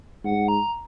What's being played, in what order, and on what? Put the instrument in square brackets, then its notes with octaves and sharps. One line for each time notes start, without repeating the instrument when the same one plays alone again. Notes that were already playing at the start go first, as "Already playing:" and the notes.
[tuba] G#2 [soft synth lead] F#5
[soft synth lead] A#5